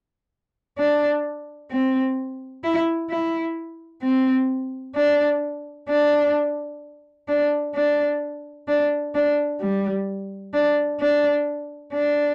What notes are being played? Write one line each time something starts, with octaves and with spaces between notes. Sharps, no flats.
D4
C4
E4
E4
C4
D4
D4
D4
D4
D4
D4
G3
D4
D4
D4